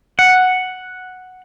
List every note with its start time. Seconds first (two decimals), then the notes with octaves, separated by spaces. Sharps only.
0.19 F#5